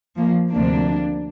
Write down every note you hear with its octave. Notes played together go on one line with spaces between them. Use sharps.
F3 A#3
D2 C3 F3 A#3 D4